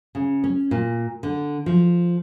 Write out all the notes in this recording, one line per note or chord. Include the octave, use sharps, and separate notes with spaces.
C#3
C#4
A#2
D3
F3